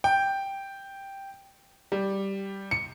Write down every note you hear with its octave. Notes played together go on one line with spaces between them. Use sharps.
G5
G3
C#7